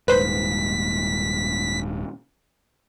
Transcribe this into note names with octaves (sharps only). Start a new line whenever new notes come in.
D#1 G#2 B4 C5 B6